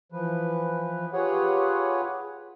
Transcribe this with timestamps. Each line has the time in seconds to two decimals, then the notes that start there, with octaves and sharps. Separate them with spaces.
0.12 E3 F3 B4
1.13 F4 G4 G#4 B4 C#5 F#5